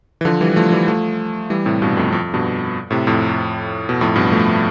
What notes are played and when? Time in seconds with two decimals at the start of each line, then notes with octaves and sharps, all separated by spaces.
0.21 E3
0.25 D3 F3
0.41 E3 G3
0.56 F3 A3
0.72 E3 G3
0.88 F3 A3
1.50 E3 G3
1.66 A2 C3
1.82 G2 B2
1.97 F2 A2
2.12 F2
2.34 G2 B2
2.91 A2 C3
3.07 F2 A2
3.89 B2
4.01 F2 A2
4.16 G2 B2
4.32 F3 A3